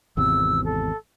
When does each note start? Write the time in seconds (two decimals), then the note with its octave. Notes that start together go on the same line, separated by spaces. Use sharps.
0.17 G#1 E2 C3 E6
0.65 A4